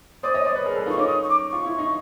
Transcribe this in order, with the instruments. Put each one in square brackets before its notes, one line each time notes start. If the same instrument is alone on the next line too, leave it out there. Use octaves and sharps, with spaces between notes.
[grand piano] C5 D5 [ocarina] D#6
[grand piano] C#5 D#5
C5 D5
B4 C#5
G#4 A#4
A4 B4
[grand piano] D#4 F4 [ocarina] C#6
[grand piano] C#4 D#4 [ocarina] D6
[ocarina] D#6
C#6
D6
[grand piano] F4 [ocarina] C#6
[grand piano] E4
D#4